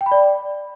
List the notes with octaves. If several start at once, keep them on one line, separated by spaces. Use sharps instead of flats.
G5
B5
D5